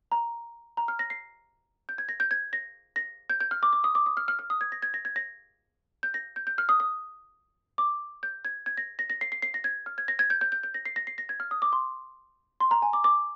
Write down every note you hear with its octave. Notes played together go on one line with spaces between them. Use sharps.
A#5
A#5
F6
A#6
C7
G6
G#6
A#6
G6
G#6
A#6
A#6
G6
G6
F6
D6
D6
D#6
D6
D#6
F6
F6
F6
D#6
G#6
A#6
G#6
A#6
G#6
A#6
G6
A#6
G6
G6
F6
D#6
D#6
D6
G6
G#6
G#6
A#6
A#6
A#6
C7
C7
C7
A#6
G#6
F6
G#6
A#6
G#6
G6
G6
G6
G6
A#6
C7
A#6
C7
A#6
G#6
F6
D#6
D6
C6
C6
A#5
G#5
D6
D6